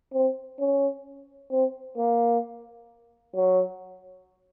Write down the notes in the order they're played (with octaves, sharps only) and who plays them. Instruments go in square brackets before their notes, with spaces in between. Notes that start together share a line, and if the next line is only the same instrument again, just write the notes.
[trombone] C4
C#4
C4
A#3
F#3